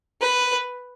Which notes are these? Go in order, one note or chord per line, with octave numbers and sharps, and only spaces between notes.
B4